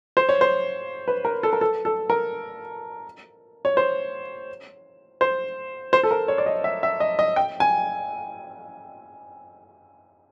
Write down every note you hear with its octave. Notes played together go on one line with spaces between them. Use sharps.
C5
C#5
C5
B4
A#4
A4
A#4
A4
A4
A#4
C#5
C5
C5
C5
A4
A#4
C#5
D5
D#5
E5
E5
D#5
D#5
G5
G#5